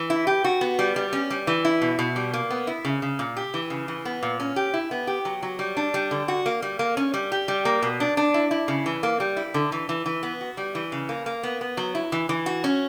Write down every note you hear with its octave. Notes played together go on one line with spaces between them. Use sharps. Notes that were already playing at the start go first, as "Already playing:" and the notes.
Already playing: E3
E4
G4
F#4
B3
G3
G3
C#4
G3
E3
E4
B2
B2
G3
A#3
B3
E4
C#3
C#3
A#2
G4
E3
C#3
E3
B3
A#2
C#4
G4
E4
B3
G4
F#3
F#3
G3
D4
G3
D3
F#4
A#3
G3
A#3
C#4
G3
G4
G3
A#3
B2
D4
D4
E4
E4
C#3
E3
A#3
G3
E4
D3
E3
E3
E3
B3
F#4
G3
E3
C#3
A#3
A#3
B3
B3
F#3
E4
E3
E3
F#4
C#4